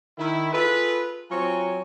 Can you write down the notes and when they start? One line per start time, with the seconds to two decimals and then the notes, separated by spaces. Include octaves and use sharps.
0.18 D#3 E4
0.53 F4 G#4 A4 B4
1.31 F#3 C4 F4 C#5 G#5 A#5